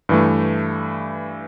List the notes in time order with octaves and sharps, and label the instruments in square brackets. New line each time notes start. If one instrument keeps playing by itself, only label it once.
[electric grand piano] G2 E3 A3